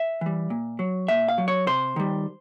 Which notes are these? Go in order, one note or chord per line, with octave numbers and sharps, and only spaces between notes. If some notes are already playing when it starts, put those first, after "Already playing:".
Already playing: E5
E3 G3
A#2
F#3
A#2 E5
F5
F#3
C#5
C3 C5
D#3 G3